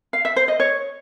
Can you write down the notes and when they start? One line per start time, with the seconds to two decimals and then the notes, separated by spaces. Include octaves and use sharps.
0.13 F5
0.25 E5
0.36 C5
0.48 D#5
0.60 C#5